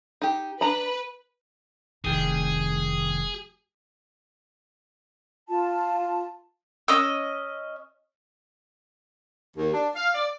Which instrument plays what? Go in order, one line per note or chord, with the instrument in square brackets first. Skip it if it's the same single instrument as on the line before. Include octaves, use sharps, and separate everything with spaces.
[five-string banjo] D#4 G4
[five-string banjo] D4 A#5 B5 [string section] B4
[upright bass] F1 F2 [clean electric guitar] C2 D#3 G4 [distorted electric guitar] G#4
[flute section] F4 A5
[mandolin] C#4 D#5 E6
[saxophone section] D#2
D4
F5
D5